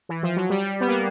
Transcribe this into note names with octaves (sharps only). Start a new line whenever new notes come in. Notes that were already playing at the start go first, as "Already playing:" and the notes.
E3
F3
F#3
G3
B3
A#3